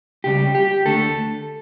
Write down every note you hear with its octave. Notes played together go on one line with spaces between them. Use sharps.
C#2 C#3 G3 G4
G4
D2 D3 A3 A4